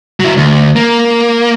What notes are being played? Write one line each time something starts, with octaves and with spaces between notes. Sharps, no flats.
F#3 E4
D2
A#3